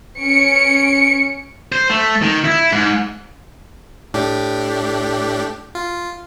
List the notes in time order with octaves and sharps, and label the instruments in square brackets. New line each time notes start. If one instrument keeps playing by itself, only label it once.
[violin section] C#4 C#7 D7
[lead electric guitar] C5
A3
D#3
E4
G#2
[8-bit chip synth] A2 D4 G4
F4